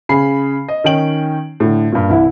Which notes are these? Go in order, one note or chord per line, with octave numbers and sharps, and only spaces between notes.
C#3 G#4 B5 C7
D#5
D#3 C#4 D#4 G5 D7 F#7
A2 D3
G2 A#2
C2 E3 E4